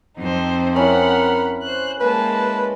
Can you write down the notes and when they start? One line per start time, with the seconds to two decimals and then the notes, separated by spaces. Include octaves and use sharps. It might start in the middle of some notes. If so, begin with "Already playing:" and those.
0.18 F2 C4 D#4 C5
0.76 C#4 E4 A#4 F#5 B5
1.62 C5 F#6
2.00 G#3 A#3 B4 A5